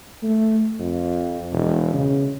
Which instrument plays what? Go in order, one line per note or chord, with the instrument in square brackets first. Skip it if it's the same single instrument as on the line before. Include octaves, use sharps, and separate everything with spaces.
[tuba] A3
F2
E1
C#3